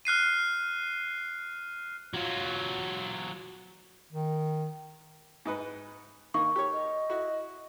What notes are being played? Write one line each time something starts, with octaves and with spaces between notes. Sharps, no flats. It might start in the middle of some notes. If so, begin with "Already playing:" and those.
F6 F#6 C7 D#7
F#3 F4
D#3
G#2 D#4 B4
D#3 A#3 D#4 C#6
G4 A#4 C#5
D#5
E4 F#4